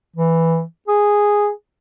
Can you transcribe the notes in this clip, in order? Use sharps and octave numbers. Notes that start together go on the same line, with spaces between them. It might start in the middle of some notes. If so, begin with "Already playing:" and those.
E3
G#4